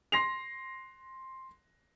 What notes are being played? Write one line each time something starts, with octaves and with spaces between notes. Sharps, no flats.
C6 A#6 C7 F7